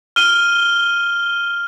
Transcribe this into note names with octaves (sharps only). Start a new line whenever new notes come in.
F6 D#7 G7